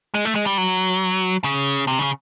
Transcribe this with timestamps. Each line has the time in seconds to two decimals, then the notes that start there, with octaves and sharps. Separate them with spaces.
0.14 G#3
0.25 A3
0.35 G#3
0.46 G3
0.58 F#3
1.44 C#3
1.87 C3
1.99 C#3